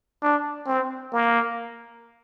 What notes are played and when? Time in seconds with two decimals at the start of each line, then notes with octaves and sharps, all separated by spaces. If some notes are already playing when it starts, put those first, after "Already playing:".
0.23 D4
0.67 C4
1.13 A#3